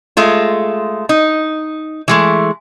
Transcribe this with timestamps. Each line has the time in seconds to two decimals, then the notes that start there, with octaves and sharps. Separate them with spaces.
0.17 G#3 A3 F4
1.09 D#4
2.08 E3 G#3 A3